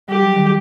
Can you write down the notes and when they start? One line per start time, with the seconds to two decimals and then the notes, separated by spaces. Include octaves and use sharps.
0.09 G3 G4
0.22 F#3
0.35 D#3 G3